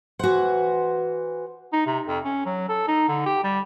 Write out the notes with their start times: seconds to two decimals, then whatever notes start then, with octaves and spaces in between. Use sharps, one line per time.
0.19 E3 F#4 C5 F#5
1.73 D#4
1.86 C3
2.07 F2
2.24 C#4
2.45 F#3
2.69 A4
2.88 D#4
3.08 D3
3.26 G4
3.44 G3